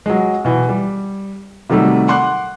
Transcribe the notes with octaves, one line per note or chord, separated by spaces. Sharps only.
F#3 G#3
B2 E3
G3
C3 D#3 F#3 G3 A3
F#5 C6 D6 F#6